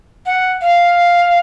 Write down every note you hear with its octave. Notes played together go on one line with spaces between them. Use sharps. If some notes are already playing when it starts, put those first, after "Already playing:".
F#5
F5